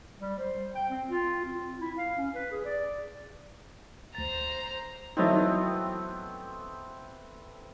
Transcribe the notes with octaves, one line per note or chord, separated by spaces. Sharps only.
G3
C5
G5
C4
F4
C4
E4
F5
C#4
B4
G#4
D5
D2 C5 A#5 A6
E3 F#3 A3 B3 C4 D#4